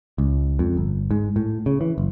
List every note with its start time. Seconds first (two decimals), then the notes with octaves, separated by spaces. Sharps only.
0.18 C#2
0.59 F2
0.77 G1
1.11 G#2
1.36 A2
1.66 C#3
1.81 E3
1.98 F#1